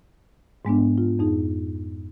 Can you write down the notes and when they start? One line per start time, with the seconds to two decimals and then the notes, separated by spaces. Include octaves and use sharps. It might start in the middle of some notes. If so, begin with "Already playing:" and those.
0.65 G#2 G#3 B3 D4
0.98 F4
1.19 F2 D#4 G#4